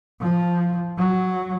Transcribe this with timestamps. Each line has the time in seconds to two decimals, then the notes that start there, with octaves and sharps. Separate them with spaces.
0.21 F3
0.98 F#3